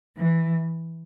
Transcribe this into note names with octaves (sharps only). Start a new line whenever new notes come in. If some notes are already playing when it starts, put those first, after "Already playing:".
E3